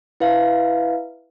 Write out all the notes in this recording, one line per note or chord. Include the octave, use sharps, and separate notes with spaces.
E4 B4 E5 F5